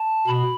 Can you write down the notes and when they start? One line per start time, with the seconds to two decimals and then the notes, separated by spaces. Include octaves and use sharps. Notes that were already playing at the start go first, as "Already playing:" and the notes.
Already playing: A5
0.27 B2 B5